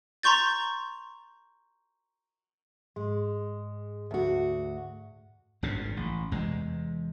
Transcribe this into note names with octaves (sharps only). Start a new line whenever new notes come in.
A#5 C6 C#6 G6 A6
G#2 G#3
D2 F#4
G#1 G2 A#2 C#3
A1
E2 C3 G#3